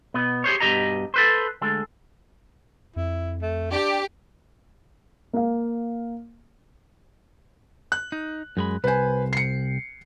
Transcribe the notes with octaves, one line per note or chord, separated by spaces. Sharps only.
B2 B3
G4 G#4 C5 C#5
G2 B2 A3 G4 D#5 A#5
A4 B4 C5
D2 G#3 A4
F2 E4
A3
D4 G4
A#3 F5
F#6
D#4
F#2 G#3 B5
C2 B4 C5 G#5
C7 C#7